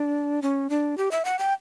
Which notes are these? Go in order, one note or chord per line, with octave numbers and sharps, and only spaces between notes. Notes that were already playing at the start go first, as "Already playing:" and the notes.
Already playing: D4
C#4
D4
G4
E5
F#5
G5